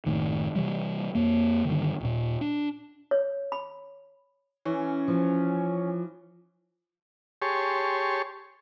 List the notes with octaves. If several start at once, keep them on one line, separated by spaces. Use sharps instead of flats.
F#1 A2 D#3
C3 E3 G3
F2 A#3
G2 D3 D#3
D#1 A#2
D4
C#5
B5
E3 C#4
F3
G4 G#4 C#5 A5 C6 C#6